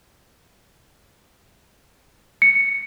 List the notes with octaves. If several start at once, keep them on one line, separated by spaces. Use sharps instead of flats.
C#7